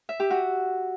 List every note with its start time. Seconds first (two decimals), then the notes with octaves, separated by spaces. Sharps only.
0.09 E5
0.20 G4
0.30 F#4